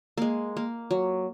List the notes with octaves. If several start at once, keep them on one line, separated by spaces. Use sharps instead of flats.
G#3 A#3
A#3
F#3